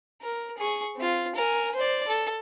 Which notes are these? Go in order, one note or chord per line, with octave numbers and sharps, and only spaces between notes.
A#4
G#4 C#6
C4 F4
A#4 G#5
C5 D5
A4